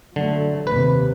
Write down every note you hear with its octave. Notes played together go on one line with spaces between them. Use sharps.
D3 F#3 A3
D#2 C3 B4